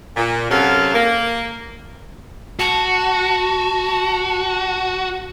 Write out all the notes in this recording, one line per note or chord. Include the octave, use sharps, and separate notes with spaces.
A#2
F#2 C3 F#3 A4 F5
A#3
F#4 A5